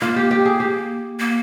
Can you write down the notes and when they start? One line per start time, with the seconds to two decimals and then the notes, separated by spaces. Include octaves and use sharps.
0.01 A#3 F4
0.16 G4
0.31 G4
0.45 G#4
0.60 G4
1.19 A#3